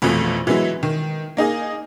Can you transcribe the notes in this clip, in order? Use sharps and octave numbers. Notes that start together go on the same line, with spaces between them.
A#1 F2 B2 E3 F3 A3
E3 F#3 G#3 B3 E4
D#3
A#3 D#4 G#4 D#5